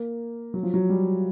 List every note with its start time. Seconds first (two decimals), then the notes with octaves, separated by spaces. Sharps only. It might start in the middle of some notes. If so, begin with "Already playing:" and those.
Already playing: A#3
0.54 F#3
0.63 F3
0.74 F#3
0.90 G3